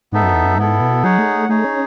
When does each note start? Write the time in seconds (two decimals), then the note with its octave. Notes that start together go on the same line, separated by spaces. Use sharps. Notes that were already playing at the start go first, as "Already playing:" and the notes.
0.12 G#2 B3 D#4 A4 E5
0.23 F#2
0.34 E2
0.44 F#2
0.58 G#2 B3 E4 A4
0.81 B2
1.03 F#3 D#4 G#4 C#5 F#5
1.18 A3
1.35 A3
1.49 A3 D#4 G#4 C#5
1.64 C#4